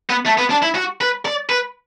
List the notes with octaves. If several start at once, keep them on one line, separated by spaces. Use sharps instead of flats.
B3
A3
B3
D4
E4
F#4
B4
D5
B4